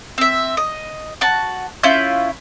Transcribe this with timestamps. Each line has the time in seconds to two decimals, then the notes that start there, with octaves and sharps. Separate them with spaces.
0.18 C4 E5
0.57 D#5
1.21 F#4 F#5 A5
1.83 C#4 E4 F4 G6